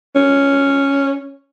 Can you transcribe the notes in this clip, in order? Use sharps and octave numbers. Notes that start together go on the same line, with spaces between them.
C#4